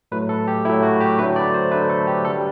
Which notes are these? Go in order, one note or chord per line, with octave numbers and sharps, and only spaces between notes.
A2 F#3 A3 B4
A4
G4
A2 F#3 A3 E4
F#4
G4
D3 F#3 A3 B4
D5
C5
D3 F#3 A3 B4
A4
G4
D3 G3 A4